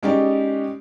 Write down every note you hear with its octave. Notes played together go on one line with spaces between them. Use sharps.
G#3 C#4 D#4 G4 D5